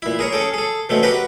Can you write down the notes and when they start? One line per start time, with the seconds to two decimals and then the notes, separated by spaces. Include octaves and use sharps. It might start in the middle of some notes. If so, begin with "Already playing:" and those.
0.02 A#2 E4
0.19 G#4 A#4 C#5
0.33 C#4 G#4 A4 G5
0.54 G#4 A4
0.89 B2 A3 C4 C#4
1.03 F#4 G4 A#4 B4 G5